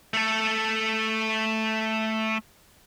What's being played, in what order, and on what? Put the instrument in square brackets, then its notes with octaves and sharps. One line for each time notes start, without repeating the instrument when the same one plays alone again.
[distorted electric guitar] A3 A4